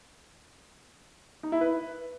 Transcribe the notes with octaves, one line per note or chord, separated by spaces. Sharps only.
D#4
E4
B4